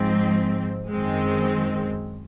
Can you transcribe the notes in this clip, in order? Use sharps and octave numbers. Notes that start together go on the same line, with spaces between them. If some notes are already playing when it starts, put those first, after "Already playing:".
Already playing: G#2 F3 C4
F#2 D#3 G#3 C4